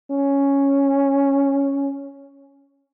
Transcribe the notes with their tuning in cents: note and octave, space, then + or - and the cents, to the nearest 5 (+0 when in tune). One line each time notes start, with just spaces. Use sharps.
C#4 +0